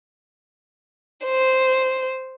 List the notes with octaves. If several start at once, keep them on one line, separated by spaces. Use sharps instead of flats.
C5